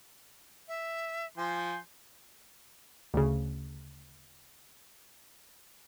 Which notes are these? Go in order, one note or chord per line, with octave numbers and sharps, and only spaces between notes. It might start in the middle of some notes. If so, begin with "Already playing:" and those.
E5
F3 G#5 C6 G6
D2 C#3